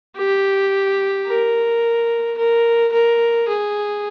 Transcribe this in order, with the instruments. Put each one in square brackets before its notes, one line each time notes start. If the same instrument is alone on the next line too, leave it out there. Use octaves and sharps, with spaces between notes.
[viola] G4
A#4
A#4
A#4
G#4